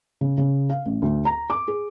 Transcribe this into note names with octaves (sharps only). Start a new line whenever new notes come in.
C#3
C#3
F5
A1
D2
A#5
D6
G#4